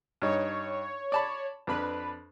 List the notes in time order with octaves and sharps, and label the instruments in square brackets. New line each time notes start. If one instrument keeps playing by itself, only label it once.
[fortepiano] G2 D#4 [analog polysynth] C#5
[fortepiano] D5 A5 B5
[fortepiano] F2 D4 B5 [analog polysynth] B4